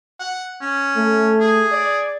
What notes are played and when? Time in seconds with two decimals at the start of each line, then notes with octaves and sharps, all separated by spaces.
0.19 F#5
0.61 C#4
0.96 A3
1.40 G#4
1.72 D5